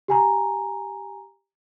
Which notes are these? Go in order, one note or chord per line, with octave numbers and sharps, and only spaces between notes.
G4 G#5 A#5